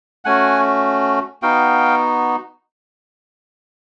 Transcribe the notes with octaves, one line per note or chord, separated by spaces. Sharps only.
A3 C#4 F#4 F#5 G#5
B3 D#4 F#4 F5 G5